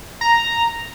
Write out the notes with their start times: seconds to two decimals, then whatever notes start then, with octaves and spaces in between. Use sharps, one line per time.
0.21 A#5